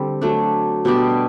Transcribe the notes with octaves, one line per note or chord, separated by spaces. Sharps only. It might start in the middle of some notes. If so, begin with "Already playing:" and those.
Already playing: D3 G3 C4 G4
F#3 A3 D4
B2 G3 D4 G4